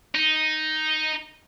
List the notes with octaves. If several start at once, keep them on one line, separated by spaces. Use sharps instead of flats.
D#4